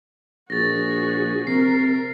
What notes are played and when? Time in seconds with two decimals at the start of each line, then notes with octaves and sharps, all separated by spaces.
0.50 A#1 F#4 G#4 A6 A#6
1.47 C3 A#4 C7